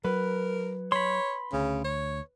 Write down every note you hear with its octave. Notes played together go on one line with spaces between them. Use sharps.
F#3 A#4 B4
C#5 B5 C6
D2 C#3
C#5